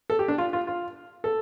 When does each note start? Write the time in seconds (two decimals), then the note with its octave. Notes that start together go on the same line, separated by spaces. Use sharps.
0.10 A4
0.19 G4
0.28 D4
0.38 F4
0.53 F4
0.67 F4
1.24 A4